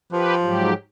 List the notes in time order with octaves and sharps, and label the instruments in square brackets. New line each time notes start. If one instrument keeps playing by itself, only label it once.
[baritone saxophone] F3 [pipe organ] G4 B4
[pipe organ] G#2 F#3 G4